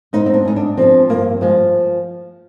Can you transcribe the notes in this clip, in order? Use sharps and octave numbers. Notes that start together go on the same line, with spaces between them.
G#2 D#4
C4
D4
G#2 D#4
D4
F3 C4
G2 A#3
F3 G#3